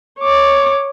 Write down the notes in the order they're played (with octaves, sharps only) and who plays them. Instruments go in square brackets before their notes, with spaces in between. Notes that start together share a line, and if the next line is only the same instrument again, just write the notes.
[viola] C#5 D6